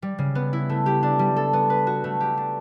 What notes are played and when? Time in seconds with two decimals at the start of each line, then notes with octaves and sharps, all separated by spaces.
0.02 G3
0.18 C#3
0.35 B3
0.53 E4
0.69 A3
0.86 G4
1.03 D4
1.19 G3
1.36 A4
1.53 B3
1.70 B4
1.87 F#4
2.04 A3
2.20 G4
2.37 D4